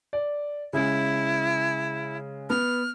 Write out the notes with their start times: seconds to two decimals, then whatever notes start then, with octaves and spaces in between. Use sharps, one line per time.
0.13 D5
0.73 C#3 G#3 E4
2.50 B3 F6